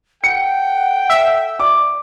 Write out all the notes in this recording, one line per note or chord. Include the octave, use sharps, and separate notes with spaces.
A4 F#5 G5 C#7
E5
D5 D6